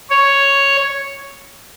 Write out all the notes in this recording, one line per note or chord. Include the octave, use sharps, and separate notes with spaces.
C#5